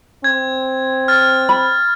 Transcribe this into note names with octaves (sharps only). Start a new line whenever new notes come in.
C4 G#6
F6 A6
B5